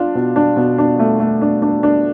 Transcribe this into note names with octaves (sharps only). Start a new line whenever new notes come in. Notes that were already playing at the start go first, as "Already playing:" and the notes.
Already playing: D4 F4
B2
D4
B2
D4
A3
A3
D4
D4
D4